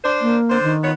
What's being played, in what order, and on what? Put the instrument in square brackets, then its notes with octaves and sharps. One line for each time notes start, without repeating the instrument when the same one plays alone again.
[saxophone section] D4 C5
[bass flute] A#3
[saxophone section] D3 C5
[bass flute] D#3
[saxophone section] B3 F4 C#5